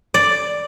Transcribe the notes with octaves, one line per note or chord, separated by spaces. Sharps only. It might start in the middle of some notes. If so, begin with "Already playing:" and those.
D5